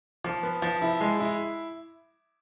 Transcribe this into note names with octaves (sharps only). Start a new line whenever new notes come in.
F3
B3
F3
E4
G#3
E4